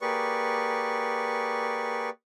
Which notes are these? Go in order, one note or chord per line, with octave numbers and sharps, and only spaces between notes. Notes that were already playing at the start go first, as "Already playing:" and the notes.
A#3 G4 G#4 B4 D5 C#6